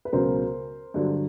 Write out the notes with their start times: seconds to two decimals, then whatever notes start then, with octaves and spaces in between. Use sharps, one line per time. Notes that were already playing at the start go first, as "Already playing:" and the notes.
0.05 B4
0.13 C#2 B2 F#3 A#4 C5
0.94 G2 D3 F#3